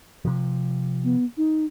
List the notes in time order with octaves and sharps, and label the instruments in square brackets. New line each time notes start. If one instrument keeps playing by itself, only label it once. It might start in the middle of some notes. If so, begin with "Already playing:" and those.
[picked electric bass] C3 F3
[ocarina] B3
D#4